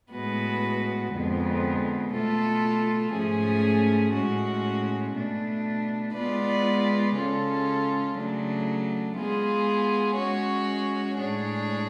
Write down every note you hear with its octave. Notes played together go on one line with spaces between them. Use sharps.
A2 G#3 B3 F#4 B4
F2 D3 G#3 B3
B2 A3 F4 A4
G#2 F3 A3 C#4 G#4
A2 G#3 C#4 F#4
B2 A3 D4
G#3 B3 F4 B4 D5
C#3 G#3 C#4 F4 A4
C#3 F#3 A3 D4
G#3 B3 F4 G#4
G#3 C#4 F#4 C#5
A2 G#3 D4 G#4 C#5